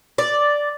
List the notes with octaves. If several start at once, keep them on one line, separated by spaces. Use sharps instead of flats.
D5